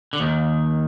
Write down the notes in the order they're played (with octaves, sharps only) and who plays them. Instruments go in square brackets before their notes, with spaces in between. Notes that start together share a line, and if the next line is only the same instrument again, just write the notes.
[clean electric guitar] D3
D#2 D#3